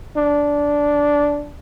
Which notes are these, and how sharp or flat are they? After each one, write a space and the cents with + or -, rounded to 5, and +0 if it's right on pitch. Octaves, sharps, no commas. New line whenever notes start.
D4 -10